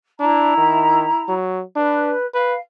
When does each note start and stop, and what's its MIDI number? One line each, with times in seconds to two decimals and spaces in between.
0.20 0.56 62
0.20 1.32 64
0.20 1.32 82
0.58 1.07 51
1.29 1.62 54
1.76 2.14 62
1.76 2.25 71
2.34 2.55 71
2.34 2.59 77